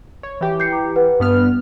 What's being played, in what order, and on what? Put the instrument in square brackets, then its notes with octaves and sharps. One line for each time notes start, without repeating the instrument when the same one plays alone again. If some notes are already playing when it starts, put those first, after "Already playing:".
[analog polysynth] C#5
E3 G4
[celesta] G6 C7 C#7
A#5 D6
B4 F#5
[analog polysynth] G2 B3 F6